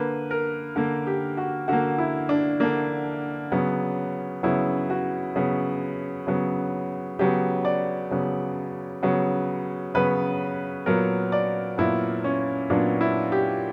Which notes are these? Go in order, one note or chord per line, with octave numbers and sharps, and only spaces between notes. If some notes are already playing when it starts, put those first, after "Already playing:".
Already playing: D3 A#3 B4
A#4
D3 A#3
G4
F#4
D3 A#3 F#4
E4
D4
D3 A#3 D4
C#3 F#3 B3
C#3 F#3 B3 E4
F#4
C#3 F#3 B3
C#3 F#3 B3
C#3 F#3 B3 G4
D5
C#3 F#3 B3
C#3 F#3 B3
C#3 F#3 B3 B4
A#2 F#3 B3 A#4
D5
A#2 F#3 B3 E4
C#4
A#2 F#3 B3 D4
E4
G4